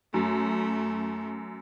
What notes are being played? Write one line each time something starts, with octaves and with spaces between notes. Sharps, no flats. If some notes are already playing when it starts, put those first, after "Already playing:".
F#2 A3